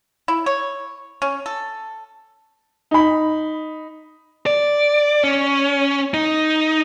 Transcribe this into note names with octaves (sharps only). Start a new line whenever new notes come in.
E4
C#5
C#4
A4
D#4 B5
D5
C#4
D#4